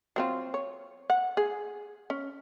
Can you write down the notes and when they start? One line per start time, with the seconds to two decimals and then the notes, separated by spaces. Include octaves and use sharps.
0.16 F#3 C4 F4
0.54 C#5
1.10 F#5
1.37 G#4
2.10 C#4